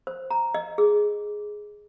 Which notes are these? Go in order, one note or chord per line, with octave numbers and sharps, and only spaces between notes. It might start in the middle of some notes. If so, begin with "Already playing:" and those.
C5
A#5
D#5
G#4